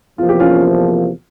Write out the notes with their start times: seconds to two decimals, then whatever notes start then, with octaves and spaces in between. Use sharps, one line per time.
0.18 E2 C3 F3 A#3 F4
0.29 G4
0.40 C#4 F4